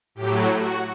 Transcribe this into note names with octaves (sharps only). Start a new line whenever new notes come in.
A2 F#3 G4
F#4